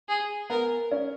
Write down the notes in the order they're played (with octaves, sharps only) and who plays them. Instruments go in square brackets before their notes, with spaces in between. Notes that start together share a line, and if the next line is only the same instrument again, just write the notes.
[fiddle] G#4
[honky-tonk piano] B3 [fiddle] A#4
[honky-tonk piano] C#4